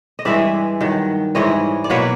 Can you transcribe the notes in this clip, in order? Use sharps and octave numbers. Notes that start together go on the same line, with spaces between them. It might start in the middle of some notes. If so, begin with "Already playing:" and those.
D#5
G2 E3 G#3 D5 E5
G2 D#3 F#3
G#2 E3 G3 C#5 D#5
D5
B2 F#3 A#3 B4 C#5